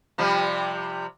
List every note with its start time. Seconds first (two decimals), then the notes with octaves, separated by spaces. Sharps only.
0.18 C3 F3 G3